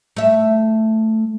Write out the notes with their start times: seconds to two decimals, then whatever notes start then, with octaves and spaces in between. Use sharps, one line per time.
0.16 A3 E5